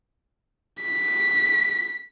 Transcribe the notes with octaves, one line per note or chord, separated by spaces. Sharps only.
B6